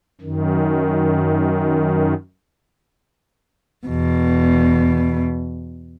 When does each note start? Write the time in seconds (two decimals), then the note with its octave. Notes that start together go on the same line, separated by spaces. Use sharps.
0.21 F#2 D#3
3.87 E2 B2